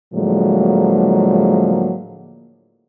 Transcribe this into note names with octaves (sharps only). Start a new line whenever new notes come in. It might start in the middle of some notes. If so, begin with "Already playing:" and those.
A2 D3 F3 F#3 G#3 A#3